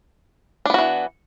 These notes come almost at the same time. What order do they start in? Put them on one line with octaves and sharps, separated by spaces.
D4 B3 F#4 E3